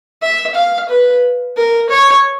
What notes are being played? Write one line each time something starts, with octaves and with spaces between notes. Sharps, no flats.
E5
F5
B4
A#4
C#5